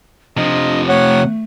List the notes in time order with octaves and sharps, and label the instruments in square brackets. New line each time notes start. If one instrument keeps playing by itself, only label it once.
[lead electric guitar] C3 F3 [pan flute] D4 [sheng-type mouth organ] D#5
[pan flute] A3 [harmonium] C#5 [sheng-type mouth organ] F#5